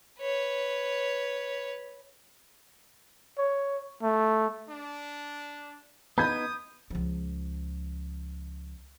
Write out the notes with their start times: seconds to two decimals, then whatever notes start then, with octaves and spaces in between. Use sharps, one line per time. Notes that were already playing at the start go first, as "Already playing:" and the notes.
0.20 B4 C#5
3.38 C#5
4.03 A3
4.69 D4
6.18 B3 D#4 B5 D#6 G6 G#6
6.90 C#2 F3